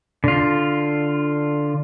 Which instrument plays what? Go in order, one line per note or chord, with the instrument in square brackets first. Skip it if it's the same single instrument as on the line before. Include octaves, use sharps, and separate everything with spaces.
[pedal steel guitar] D3 F4